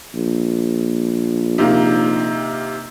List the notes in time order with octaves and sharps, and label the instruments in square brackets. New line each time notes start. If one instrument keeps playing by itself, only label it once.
[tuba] A#1
[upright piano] C3 D#3 A#3